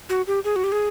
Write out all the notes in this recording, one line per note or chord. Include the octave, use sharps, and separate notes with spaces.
F#4
G4
G#4
F#4
G4
G#4